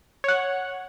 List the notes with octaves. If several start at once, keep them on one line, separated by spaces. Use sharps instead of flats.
C#5 F#5